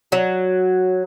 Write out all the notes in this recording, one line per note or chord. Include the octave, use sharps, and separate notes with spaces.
F#3